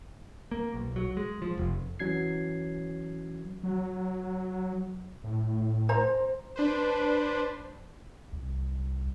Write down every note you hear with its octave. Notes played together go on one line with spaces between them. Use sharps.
A#3
B1
F#3
G#3
F3
F1
E3 F#3 C#4 G#6 C7
F#3
A2
C5 A#5
D4 B4 C5
C2